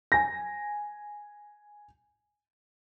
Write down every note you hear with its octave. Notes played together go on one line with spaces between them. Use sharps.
G#5 A#6